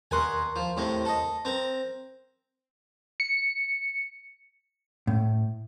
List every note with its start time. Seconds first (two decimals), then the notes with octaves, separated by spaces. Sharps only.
0.11 D#2 B2 A#4 F#5 G#5 C6
0.56 F3
0.77 A2 C3 C4
1.05 A4 D#5
1.45 C4 A#4
3.20 C#7
5.07 A2